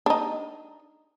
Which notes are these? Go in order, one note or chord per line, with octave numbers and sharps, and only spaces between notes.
D4 D#4